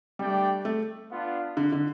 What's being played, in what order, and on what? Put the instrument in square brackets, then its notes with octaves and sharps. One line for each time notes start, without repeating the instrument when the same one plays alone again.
[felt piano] G3 [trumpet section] A3 D4 G4 D5 G5
[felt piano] A3
[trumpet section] B3 D4 F4
[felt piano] D3
D3